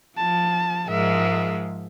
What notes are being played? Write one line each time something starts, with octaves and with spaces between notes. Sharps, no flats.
F3 A5
G#2 F3 G#3 A#4 E5